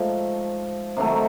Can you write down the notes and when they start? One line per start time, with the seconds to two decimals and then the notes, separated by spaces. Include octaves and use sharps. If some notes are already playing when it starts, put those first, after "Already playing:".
Already playing: G#2 F3 A3
0.97 C3 D#3 F#3 A3